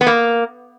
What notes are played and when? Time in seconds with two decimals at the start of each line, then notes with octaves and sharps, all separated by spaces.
0.01 B3
0.07 A#3